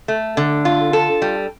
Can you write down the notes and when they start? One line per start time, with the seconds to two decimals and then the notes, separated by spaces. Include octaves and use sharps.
0.08 A3
0.37 D3
0.65 F4
0.93 A4
1.22 G3